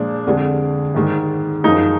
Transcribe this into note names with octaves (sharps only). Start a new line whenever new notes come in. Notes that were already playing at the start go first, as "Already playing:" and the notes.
Already playing: A#2 F3 G#3 D4
F2 D3 G#3
G#2 D#3 G#3
F#2 F3 G#3 D#4